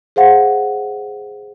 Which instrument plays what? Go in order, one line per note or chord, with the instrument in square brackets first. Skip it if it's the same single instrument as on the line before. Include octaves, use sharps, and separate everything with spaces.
[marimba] G#4 C5 F5 F#5